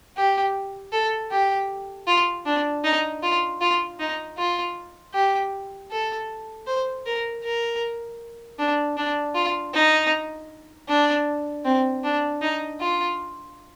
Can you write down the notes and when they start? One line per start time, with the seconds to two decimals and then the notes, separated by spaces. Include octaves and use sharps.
0.17 G4
0.92 A4
1.31 G4
2.07 F4
2.46 D4
2.84 D#4
3.23 F4
3.61 F4
3.99 D#4
4.37 F4
5.14 G4
5.91 A4
6.67 C5
7.06 A#4
7.44 A#4
8.58 D4
8.97 D4
9.35 F4
9.74 D#4
10.89 D4
11.65 C4
12.04 D4
12.41 D#4
12.80 F4